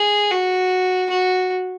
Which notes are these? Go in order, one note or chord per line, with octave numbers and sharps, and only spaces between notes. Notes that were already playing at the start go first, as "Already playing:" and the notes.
Already playing: G#4
F#4
F#4